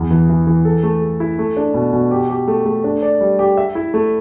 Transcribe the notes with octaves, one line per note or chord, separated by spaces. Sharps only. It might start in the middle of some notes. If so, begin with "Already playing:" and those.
Already playing: E2
E3
E3
E3
A4
A3
A4
E4
A3
D4
B2
B2
G4
G4
A3
A3
D4
D5
G3
G4
E5
E4
A3